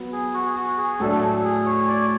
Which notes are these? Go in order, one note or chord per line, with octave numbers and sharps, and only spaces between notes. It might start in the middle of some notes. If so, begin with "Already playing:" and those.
Already playing: F#3 B3
G#4
F#4
G#4
F#4
G#4
A2 F#3 A3 D4 A4
G#4
C#5
D5